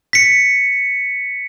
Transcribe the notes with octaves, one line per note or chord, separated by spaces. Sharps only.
B6 C#7